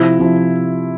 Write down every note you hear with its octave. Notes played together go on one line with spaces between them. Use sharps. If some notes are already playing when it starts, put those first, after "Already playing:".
Already playing: C3 F3 E4
C3 F3